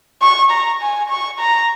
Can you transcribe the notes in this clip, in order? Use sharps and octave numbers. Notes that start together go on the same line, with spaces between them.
C#6
A#5
G#5
C#6
A#5